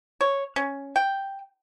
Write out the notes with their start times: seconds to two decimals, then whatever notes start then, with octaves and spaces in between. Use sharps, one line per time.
0.21 C#5
0.56 C#4
0.96 G5